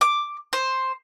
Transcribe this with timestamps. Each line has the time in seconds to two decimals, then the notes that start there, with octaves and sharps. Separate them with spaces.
0.01 D6
0.53 C5